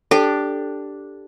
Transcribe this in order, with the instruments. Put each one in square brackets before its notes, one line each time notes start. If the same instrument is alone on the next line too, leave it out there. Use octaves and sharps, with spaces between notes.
[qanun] D4 G4 D6 [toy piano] A4